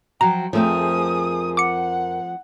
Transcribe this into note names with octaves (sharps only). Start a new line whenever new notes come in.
F3 F#3 F#4 G5 A#5
F2 F3 A3 C4 G#4 A#4 D#6
F#5 D6 C#7